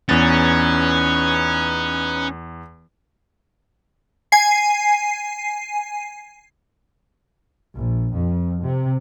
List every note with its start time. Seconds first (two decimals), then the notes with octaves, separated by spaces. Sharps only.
0.09 E2 C#4 D#4 B4 A6
4.32 G#5 C7
7.75 A#1
8.14 F2
8.63 C3